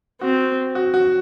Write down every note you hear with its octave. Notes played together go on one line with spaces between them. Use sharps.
C4 F#4
F#4
F#4